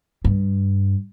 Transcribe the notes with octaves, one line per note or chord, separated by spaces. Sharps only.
G2